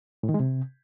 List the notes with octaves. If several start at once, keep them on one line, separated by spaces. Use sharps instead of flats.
A2
D#3
G#3
C3